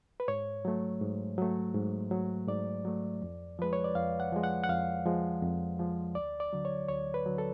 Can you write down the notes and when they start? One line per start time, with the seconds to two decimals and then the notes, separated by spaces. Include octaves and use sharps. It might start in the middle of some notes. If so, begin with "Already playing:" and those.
0.20 B4
0.28 G#2 C#5
0.65 F#3 A3
1.01 G#2
1.38 F#3 A3
1.75 G#2
2.11 F#3 A3
2.48 G#2 D5
2.85 F#3 A3
3.22 F2
3.59 F3 G#3 B4
3.73 C#5
3.84 D5
3.95 F2 F5
4.20 F#5
4.32 F3 G#3
4.44 F#5
4.64 F#5
4.68 F2 F5
5.05 F3 G#3
5.42 F2
5.79 F3 G#3
6.15 D2 D5
6.40 D5
6.53 D3 F#3
6.65 C#5
6.88 D2 C#5
7.14 B4
7.26 D3 F#3
7.38 A4